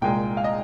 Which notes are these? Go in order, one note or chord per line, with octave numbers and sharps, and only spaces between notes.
C2 A#2 G#3 G5
F5
D#5